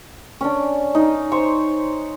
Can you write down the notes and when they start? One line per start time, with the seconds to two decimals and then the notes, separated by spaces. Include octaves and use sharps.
0.41 C#4 D4
0.95 D#4
1.32 C5 C#5 C#6